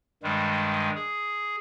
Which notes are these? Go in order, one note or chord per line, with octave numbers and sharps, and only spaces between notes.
G2 D#3 G3 G#3
G#4